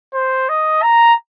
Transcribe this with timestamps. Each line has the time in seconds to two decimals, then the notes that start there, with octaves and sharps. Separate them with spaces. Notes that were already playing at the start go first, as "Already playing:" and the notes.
0.14 C5
0.49 D#5
0.83 A#5